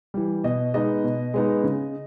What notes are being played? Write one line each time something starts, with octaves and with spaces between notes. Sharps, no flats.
E3 G3
B2 D#5
G#3 B3 D#4 D#5
B2
G#3 B3 D#4
C#3